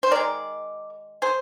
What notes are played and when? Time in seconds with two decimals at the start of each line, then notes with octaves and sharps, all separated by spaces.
0.03 C5
0.11 D#3 G#3 A#4 D5
1.22 G#4 C5